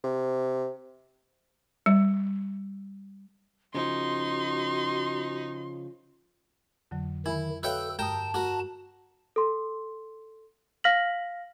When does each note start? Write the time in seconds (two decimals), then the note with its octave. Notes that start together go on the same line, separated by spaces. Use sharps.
0.04 C3
1.86 G3
3.74 C#3 F3 D#4 F#4 C6
6.91 F2 D3 F#3
7.26 D#3 E4 G#5 B5
7.63 F#4 A4 B4 C#5 E5 F5 G5
7.99 G2 A#4 G5 A5 D#6
8.34 F#4 A#4
9.36 A4 C6
10.84 F5 F6 A#6 B6 F#7